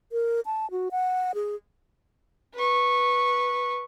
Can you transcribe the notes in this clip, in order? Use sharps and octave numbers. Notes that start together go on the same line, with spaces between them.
A#4
A5
F#4
F#5
G#4
B4 C#6